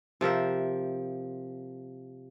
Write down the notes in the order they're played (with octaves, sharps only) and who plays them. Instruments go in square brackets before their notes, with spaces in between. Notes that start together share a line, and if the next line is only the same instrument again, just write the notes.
[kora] C3 F3 A#4 E5